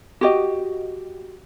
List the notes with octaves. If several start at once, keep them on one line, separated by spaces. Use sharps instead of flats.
F#4 G4 D#5